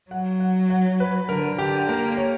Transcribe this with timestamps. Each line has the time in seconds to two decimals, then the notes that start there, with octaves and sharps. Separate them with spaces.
0.11 F#3 F#5
0.40 F#5
0.70 F#5
1.00 B4
1.29 D3 A#4
1.58 D3 G4
1.89 A#3 A#4
2.17 C#5